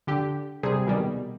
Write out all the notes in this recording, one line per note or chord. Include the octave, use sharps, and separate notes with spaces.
D3 G4
C3 G3 G#4
B2 D#3 G3